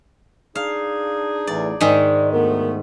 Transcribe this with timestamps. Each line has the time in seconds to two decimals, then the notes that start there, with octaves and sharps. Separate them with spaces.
0.55 D4 D#4 G#4 F5
1.47 A1 E2 A2 D5
1.81 G#2 D#3 G#3 D5
2.32 D2 A3 B3 A#4